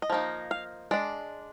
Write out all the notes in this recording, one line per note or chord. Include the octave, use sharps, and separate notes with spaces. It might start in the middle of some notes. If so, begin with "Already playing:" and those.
D#5
F3 A#3 D#4
F5
G#3 D4 D5